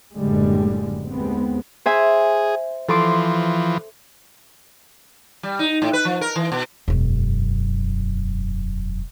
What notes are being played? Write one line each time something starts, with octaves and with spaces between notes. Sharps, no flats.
F#1 A2 D3 G3 G#3
D#2 G#3 B3 C4
G#4 C5 E5 G#5
E3 F3 A4 C6 D6
G3
D#4
A2
B4
F3
A#4
E3
B2
E1 F#2